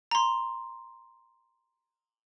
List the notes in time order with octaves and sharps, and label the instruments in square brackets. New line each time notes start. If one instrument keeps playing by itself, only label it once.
[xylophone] A#5 C6